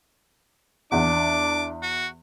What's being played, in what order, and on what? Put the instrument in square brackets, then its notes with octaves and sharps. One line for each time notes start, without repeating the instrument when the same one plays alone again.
[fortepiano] E2 [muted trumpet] D4 [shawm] D6
[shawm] F#4